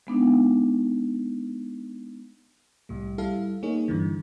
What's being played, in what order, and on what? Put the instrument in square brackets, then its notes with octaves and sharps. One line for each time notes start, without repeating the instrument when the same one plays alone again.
[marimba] G#3 B3 D4 D#4
[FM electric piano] C2 A2 G3
G3 E4 A4 F5
A#3 D#4 G#4 C#5
G2 D3 E3